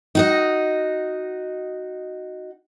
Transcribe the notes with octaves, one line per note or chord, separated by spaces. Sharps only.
D#4 F#4 D#5